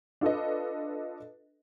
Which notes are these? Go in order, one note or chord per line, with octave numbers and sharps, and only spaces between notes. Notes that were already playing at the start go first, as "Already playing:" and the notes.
D4 F4 A4 B4 D#5